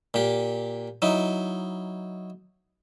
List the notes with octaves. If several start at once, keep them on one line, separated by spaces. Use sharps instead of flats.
A#2 G4
F#3 D#4 E4